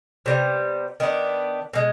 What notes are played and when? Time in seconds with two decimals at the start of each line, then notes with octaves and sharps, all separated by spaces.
0.26 C3 G3 B3
1.00 D#3 B3 D4
1.73 B2 G#3